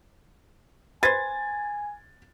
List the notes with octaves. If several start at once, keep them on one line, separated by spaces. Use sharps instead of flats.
B4 C5 G#5 G#6 A6